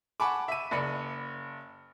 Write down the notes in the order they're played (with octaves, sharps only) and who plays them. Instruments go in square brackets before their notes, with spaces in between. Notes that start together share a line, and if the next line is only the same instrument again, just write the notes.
[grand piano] F#5 G#5 A5 B5 C#6 D6
E5 D#7
F#1 D5 B5 C#7